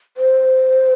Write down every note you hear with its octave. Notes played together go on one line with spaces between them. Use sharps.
C5